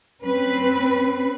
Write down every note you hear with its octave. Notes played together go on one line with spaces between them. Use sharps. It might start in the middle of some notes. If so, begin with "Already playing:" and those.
C4 C#4 B4